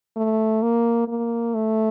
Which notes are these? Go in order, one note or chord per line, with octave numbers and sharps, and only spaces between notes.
A3
A#3
A#3
A3